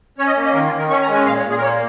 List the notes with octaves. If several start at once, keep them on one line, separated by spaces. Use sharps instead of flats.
C#4 C#5
D#5
A#3
D#5
D#3 A#4
F4
D#3
A#4
C#4 C#6
A#5
G#3
G#5
A#2 F5
C#5
A#2
G#4
A#4
A#3 C#5